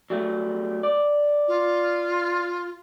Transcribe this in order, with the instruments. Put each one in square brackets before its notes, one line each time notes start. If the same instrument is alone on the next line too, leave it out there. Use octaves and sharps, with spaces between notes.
[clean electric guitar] F#3 G3 A3
D5
[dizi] F4